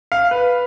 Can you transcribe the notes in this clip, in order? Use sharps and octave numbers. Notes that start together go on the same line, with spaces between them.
F5
B4